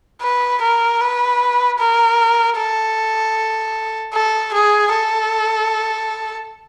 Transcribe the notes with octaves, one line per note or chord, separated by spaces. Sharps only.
B4
A#4
B4
A#4
A4
A4
G#4
A4